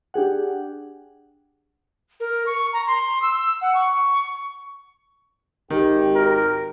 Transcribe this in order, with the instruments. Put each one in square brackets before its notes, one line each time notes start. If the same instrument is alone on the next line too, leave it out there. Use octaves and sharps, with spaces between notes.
[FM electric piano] D4 G4 G#4 F#5
[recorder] A#4
C#6
A#5
C6
E6
E6
F#5
C#6
[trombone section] G#1 G4 [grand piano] D#3
[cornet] A#4